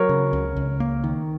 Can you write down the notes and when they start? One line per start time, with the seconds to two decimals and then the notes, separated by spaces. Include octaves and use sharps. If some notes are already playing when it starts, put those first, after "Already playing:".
Already playing: F#3 A#4 C#5
0.09 C#3
0.33 C#2
0.56 C#2
0.80 A#3
1.04 D#3